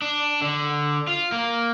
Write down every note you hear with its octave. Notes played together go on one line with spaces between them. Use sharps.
D4
D3
F4
A#3